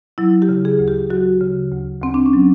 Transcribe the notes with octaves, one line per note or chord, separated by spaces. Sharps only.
F#3 E4
G4
C#3
G#4
D2
G4
F#3 F#4
C#3
D2
D2 C4
D4
C#4
F#3